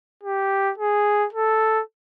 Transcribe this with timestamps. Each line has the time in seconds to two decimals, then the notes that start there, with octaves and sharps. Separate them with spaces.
0.23 G4
0.78 G#4
1.33 A4